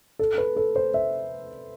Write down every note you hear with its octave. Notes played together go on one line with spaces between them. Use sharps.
A4
B4
A4
C5
E5